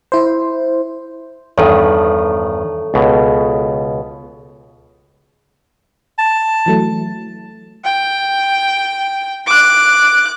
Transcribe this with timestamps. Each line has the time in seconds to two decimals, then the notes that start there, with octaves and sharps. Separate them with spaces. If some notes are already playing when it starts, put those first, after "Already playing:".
0.12 E4 C5
1.58 E2 G2 D#3 A4 C#5
2.94 C#2 B2
6.19 A5
6.66 E3 F#3 A3
7.84 G5
9.47 D6 F#6